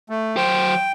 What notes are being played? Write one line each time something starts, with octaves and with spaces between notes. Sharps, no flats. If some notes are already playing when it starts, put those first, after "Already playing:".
A3
F#3 C5 G5